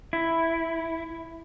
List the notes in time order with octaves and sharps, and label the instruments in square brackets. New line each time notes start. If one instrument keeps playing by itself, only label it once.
[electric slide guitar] E4